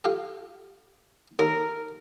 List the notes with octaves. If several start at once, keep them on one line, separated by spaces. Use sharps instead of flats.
F4 G4 A4
D#2 A#4